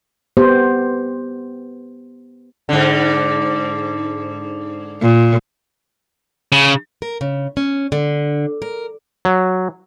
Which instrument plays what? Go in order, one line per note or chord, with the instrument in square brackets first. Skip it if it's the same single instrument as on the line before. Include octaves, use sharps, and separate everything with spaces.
[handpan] B3 G4 C5
[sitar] G#2 D3
[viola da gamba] A#2
[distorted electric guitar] C#3
[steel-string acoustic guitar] A#4
C#3
C#4
D3
A#4
[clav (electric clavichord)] F#3